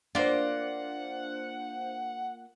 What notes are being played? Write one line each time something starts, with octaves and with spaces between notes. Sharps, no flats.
A#3 D4 F4 C5 D5 F#5